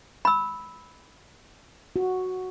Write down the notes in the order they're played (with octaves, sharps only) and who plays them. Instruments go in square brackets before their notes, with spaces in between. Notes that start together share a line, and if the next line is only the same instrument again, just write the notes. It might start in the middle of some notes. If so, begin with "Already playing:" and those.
[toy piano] B5 E6
[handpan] F#4